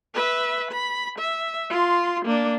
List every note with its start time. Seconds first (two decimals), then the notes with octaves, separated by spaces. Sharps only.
0.14 B4 E5
0.71 B5
1.19 E5
1.70 F4 C6
2.25 A#3 D4